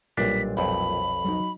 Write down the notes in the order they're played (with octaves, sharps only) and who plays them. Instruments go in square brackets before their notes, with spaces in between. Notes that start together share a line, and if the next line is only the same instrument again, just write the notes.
[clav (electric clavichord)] B1 D4 [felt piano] A#2 F#3 G3 [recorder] B6
[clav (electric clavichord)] B1 F2 [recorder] B5
[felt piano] F#3 D#4